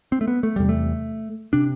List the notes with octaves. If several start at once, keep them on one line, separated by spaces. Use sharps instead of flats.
C4
A3
B3
A3
E2 C3 G3
A3
C3 D4